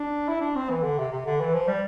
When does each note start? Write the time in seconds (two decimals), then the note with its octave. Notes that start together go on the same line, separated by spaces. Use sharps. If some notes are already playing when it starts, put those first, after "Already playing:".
Already playing: D4
0.28 E4
0.41 D4
0.55 C4
0.70 E3
0.83 D3
0.98 C3
1.12 C3
1.26 D3
1.40 E3
1.54 F3
1.68 G3